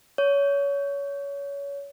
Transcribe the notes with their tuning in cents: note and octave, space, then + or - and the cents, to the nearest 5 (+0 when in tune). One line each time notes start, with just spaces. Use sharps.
C#5 +25